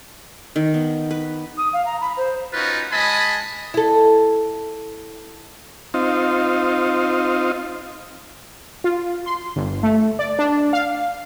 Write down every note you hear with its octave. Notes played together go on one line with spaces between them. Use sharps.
D#3
B3
B4
D#6
F5
A#5
B5
C5
C#4 D#4 F4 F#4 B4
G#3 D#5 G#5 A5 B5
E4 A4
C4 D#4 F4
F4
C6
G1
A3
D5
D4
F5